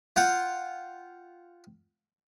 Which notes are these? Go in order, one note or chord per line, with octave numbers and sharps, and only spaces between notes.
F4 F#5 G5